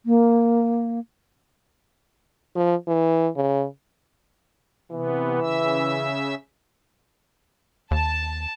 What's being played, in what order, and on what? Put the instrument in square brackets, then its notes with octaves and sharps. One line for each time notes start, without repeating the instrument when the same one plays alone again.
[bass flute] A#3
[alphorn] F3
E3
C#3
[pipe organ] C3 B3 [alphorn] E3
[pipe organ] C#3 E5 E6
[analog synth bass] D#2 [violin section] A5